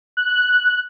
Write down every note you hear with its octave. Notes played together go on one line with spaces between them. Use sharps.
F#6